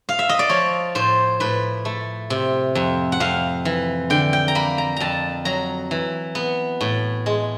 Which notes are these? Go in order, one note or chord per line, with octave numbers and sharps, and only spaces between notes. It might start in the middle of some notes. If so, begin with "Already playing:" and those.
F5
E5
D#5
D5
F3 C#5
A2 C5
A2 B4
A3
C3
F2
F#5
F2 F5
E3
D3 G5
G5
A#5
A#3 B5
A#5
F2 A5 A#5
F#3 A#5
E3
B3
A2
G#3